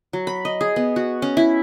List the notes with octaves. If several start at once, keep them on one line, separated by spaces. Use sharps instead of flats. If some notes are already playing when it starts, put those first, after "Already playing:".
F#3
B5
D#5
G#4
B3
F#4
C#4
E4